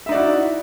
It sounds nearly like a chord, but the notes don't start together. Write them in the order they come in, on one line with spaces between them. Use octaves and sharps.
E5 D#4 D5 F#4 E4